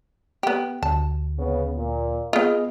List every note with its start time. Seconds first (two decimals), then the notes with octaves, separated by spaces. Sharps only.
0.43 B3 G4
0.83 D2 A5
1.38 C#3 B3
1.76 A#2
2.33 B3 F4 G#4 D#5